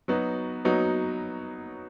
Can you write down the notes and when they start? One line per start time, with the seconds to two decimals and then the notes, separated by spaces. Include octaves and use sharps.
0.08 F#3 B3 D#4 F#4
0.65 F#3 B3 D#4 F#4